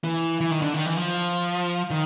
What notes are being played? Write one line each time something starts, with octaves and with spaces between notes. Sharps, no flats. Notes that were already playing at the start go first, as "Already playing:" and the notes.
E3
E3
D#3
D3
D#3
E3
F3
D#3